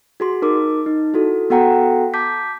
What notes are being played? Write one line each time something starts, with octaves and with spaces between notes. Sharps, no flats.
F#4 G#4 C6
D#4 A#4 D6
D#4
E4 F#4 A4
B3 F#4 A4 F#5 G5 A#5
A5 D6 G6 B6